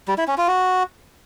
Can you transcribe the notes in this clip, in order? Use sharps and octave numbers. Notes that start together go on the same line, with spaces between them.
G3
E4
C#4
F4
F#4